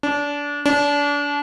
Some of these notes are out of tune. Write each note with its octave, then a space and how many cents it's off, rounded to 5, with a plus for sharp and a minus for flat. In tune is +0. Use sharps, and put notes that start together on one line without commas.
D4 -25
D4 -30